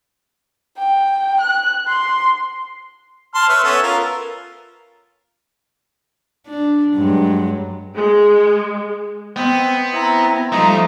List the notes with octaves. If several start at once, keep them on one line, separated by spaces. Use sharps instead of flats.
G5
F#6
C6
A5 C6 F6
B4 C#5 E5
B3 C#4 A4
F4 A#4
D4
G2 F#3 G#3
G#3
B3 C4 D#5 G5
C4 E4 A#5
F3 G3 A3 D#4 A#5